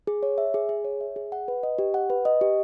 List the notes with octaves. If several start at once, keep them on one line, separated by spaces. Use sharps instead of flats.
G#4
C#5
E5
G#4
G#4
C#5
E5
G#4
F#5
B4
D#5
G4
F#5
B4
D#5
G4